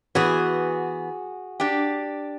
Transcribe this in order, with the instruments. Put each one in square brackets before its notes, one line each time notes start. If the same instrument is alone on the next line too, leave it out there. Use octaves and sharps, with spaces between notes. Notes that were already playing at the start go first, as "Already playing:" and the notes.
[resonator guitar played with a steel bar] E3 B3 [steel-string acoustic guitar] F#4 G#4
[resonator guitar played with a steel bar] D4 G4